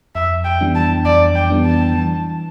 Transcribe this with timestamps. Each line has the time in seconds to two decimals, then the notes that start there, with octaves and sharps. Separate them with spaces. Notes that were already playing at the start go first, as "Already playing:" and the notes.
0.15 F2 E5
0.45 G5
0.61 E3 G3 B3 D4
0.75 A5
1.05 F2 D5
1.35 G5
1.50 E3 G3 B3 D4
1.65 A5
1.94 E3